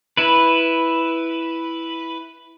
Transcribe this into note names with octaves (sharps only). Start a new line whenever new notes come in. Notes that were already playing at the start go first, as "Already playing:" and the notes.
E4 B4